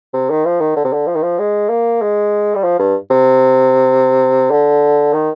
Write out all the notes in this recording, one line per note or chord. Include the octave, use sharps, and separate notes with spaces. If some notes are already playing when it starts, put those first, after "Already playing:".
C3
D#3
F3
D#3
D3
C3
D3
F3
D#3
F3
G#3
A#3
G#3
G3
F3
G2
C3
D3
D#3